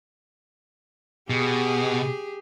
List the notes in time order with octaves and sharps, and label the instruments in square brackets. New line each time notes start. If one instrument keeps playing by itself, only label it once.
[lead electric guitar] B2 [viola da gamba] G4 G#4